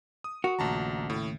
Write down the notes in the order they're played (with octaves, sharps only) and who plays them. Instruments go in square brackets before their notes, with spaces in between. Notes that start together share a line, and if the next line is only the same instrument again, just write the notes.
[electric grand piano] D#6
[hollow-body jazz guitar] F#4 [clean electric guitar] A#4 F#5
[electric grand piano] A#1 A5 A#5 [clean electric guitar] D#2 C#3 A3
[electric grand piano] A2